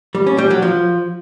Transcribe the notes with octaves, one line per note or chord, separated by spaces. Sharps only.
G3
C#4
G3
F#3
F3